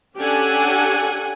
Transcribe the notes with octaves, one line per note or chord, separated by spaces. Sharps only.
C#4 D4 G4 A4 F#5 G#5